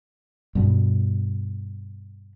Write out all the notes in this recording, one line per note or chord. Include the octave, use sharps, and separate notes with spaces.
G2 B2